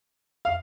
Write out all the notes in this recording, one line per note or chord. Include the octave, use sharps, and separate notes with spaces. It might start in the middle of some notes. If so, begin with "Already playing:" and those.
F5